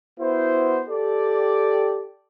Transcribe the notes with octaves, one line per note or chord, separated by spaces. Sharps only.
B3 E4 F#4 C5
G4 A4 D5